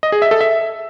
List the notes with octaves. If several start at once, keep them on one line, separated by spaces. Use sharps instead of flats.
D#5
G#4
E5
A4
E5